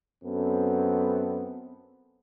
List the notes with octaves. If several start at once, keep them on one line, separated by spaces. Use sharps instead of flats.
F#2 B3 C4 A4